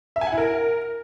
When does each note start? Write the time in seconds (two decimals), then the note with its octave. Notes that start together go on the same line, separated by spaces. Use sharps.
0.16 E5
0.21 G#5
0.27 F#5
0.32 E4
0.38 A#4